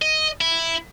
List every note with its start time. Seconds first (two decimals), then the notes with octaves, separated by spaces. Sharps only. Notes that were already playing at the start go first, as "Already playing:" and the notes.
0.02 D#5
0.41 E4